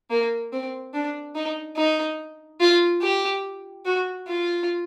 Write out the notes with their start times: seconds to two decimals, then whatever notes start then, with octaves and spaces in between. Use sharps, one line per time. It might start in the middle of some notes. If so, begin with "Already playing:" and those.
0.10 A#3
0.52 C4
0.94 D4
1.35 D#4
1.77 D#4
2.60 F4
3.02 G4
3.85 F#4
4.27 F4